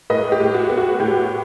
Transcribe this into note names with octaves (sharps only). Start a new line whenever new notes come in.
A2 B4 D#5
G4
A2
F#4
B3
F#4
A2 G4